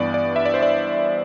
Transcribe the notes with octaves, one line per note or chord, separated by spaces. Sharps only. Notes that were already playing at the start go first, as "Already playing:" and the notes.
Already playing: G2 E3 B3 D5
D5
E5
D5
C5
D5